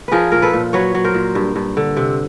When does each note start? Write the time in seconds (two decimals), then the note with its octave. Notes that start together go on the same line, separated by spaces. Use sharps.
0.08 F3 G#4 A#4 B4
0.32 A#2 A#4
0.42 A4 B4
0.53 A#2
0.73 F#3 B4 C#5
0.95 F#3
1.04 A#4 C5
1.14 A#2
1.35 G2
1.56 G2
1.77 D3
1.97 C3